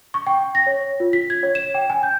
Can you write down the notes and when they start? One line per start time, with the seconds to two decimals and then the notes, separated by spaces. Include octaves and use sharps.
0.14 C#6
0.27 G5
0.55 A#6
0.66 C#5
1.00 F4
1.13 B6
1.30 G#6
1.43 C#5
1.55 E7
1.74 G5
1.90 G#5
2.03 G6